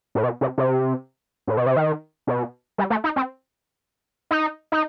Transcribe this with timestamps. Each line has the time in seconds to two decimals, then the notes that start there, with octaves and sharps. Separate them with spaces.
0.15 A2
0.23 B2
0.41 C3
0.58 C3
1.48 A2
1.57 B2
1.66 C3
1.76 D#3
2.27 B2
2.78 G3
2.90 A3
3.04 D#4
3.16 C4
4.31 D#4
4.72 D#4